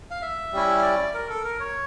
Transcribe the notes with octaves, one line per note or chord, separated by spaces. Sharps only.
F5
E5
G3 C#4 E4
D5
A#4
A4
A#4
C#5